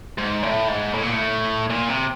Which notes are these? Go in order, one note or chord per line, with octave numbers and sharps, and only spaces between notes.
G#2
A2
G#2
A2
A#2
A2
A#2
C3